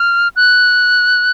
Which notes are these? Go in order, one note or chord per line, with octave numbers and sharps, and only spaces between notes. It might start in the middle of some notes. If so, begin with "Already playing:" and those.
Already playing: F6
F#6